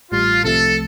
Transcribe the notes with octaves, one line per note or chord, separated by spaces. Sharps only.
A1 A2 G3 F4
C2 C3 F3 A3 A4